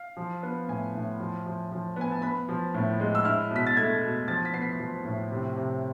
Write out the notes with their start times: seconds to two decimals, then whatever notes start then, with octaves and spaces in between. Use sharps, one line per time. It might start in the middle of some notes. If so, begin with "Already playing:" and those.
Already playing: F5
0.17 F3
0.43 B3
0.68 A2 G#5
0.95 A2
1.20 F3
1.46 F3
1.72 F3
1.96 B3 G#5
2.12 A5
2.22 B3 B5
2.49 F3
2.74 A2
3.00 G#3
3.15 E6
3.25 E4 F6
3.51 B2
3.56 B6
3.67 A6
3.77 A3 G#6
4.02 B2
4.28 F3 A6
4.45 B6
4.54 B3 C7
4.62 B6
4.79 F3
5.05 A2
5.31 C3
5.56 C3